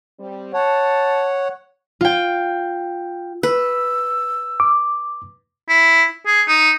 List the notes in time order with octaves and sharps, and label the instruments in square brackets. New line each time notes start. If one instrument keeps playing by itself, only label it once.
[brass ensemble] G3 C4
[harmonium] C#5 F#5 [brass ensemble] A5
[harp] F4 G5
[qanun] B4 [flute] E6
[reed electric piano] D6
[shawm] E4
G#4
D#4